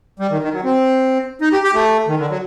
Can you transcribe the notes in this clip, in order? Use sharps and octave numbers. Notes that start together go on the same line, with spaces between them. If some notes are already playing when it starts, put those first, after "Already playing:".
G3
D#3
D#3
F#3
C4
D#4
G4
G4
A3
D#3
D3
F#3